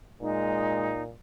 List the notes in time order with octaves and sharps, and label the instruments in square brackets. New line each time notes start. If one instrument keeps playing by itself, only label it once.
[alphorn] A#2 [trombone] G#3 [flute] D#4